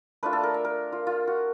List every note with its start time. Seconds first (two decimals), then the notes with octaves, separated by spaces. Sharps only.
0.23 A3 D4 F4 B4
0.33 A4
0.43 A#4
0.54 E5
0.65 A#4
0.92 F4
1.07 F4
1.28 F#4